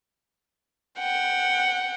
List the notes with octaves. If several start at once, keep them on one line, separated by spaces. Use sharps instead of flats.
F#5 G5